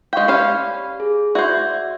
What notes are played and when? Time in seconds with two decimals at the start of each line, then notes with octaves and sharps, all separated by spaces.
0.13 G#3 F5 G5 C#6
0.28 C#4 G4 C5 D5 F5 B5
1.00 G#4
1.35 F#4 C5 D5 E5